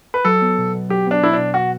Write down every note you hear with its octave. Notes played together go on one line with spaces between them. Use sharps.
B4
F#3 A4
B3
B2
B2
F#3 G4
B3 D4
B2 E4
B2 D4
F#4